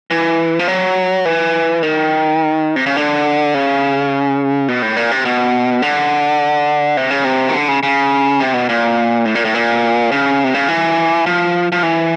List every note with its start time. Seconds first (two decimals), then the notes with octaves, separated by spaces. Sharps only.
0.11 E3
0.59 F3
0.68 F#3
1.25 E3
1.83 D#3
2.76 C3
2.86 C#3
2.97 D3
3.54 C#3
4.68 B2
4.82 A2
4.96 A#2
5.11 C3
5.25 B2
5.82 D3
6.97 C3
7.10 C#3
7.24 C3
7.49 D#3
7.54 D3
7.68 C#3
7.83 C#3
8.40 C3
8.54 B2
8.69 A#2
9.25 A2
9.35 A#2
9.45 A2
9.54 A#2
10.12 C#3
10.44 C3
10.54 C#3
10.68 E3
11.26 F3
11.72 F3
11.83 E3